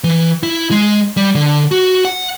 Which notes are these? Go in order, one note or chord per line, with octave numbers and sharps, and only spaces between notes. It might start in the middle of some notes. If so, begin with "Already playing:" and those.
E3
E4
G#3
G3
D3
F#4
F#5